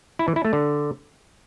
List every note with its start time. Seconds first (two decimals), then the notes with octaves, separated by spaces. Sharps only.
0.19 E4
0.28 E3
0.36 E4
0.45 A3
0.53 D3